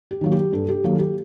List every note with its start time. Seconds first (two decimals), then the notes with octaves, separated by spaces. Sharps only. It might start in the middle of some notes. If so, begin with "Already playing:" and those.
0.11 G4
0.21 D#3 F#3 A#3
0.32 G4
0.52 G2 A4
0.68 G4
0.84 D#3 F#3 A#3 A4
0.99 G4